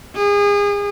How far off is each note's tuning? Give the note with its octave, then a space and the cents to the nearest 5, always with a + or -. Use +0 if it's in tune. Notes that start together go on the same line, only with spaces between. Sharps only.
G#4 -35